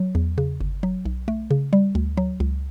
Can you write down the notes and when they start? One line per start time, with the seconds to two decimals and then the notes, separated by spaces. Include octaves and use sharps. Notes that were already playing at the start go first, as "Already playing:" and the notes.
Already playing: F#3
0.15 E2
0.38 C#3
0.61 G1
0.83 F#3
1.05 B1
1.28 A3
1.51 C#3
1.73 G3
1.95 D2
2.17 F#3
2.40 C#2